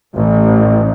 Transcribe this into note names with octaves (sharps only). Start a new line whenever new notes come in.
A1